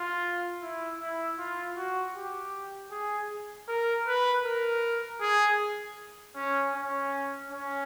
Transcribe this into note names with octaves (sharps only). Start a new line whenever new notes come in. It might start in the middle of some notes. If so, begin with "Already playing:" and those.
Already playing: F4
E4
E4
F4
F#4
G4
G#4
A#4
B4
A#4
G#4
C#4
C#4
C#4